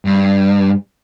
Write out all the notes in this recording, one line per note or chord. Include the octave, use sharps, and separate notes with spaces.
G2